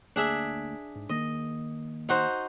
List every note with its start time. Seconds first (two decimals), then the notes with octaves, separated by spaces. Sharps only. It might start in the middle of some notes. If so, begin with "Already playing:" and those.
0.16 D2 A#3 D4 G#4 E5
0.95 G#2
1.09 D#3 A#3 D#5
2.09 D#4 F#4 C5